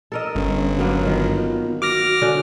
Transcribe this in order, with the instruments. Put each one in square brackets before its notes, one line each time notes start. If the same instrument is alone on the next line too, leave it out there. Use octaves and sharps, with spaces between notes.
[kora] A4 A#4 D#5 [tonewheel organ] E6
[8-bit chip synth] G1 [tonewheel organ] G3 C#4
[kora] F#3 A#3 B3
[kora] D#3 [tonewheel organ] B3 F4
[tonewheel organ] F#4 [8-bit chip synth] D6 F6 A#6
[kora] D3 C#4